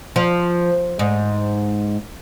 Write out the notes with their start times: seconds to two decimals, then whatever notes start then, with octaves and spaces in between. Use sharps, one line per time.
0.16 F3
0.99 G#2